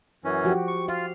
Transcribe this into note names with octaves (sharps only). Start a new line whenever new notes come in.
F#2 E3 C#4
F3 F#4 G4
C#6
F4 F5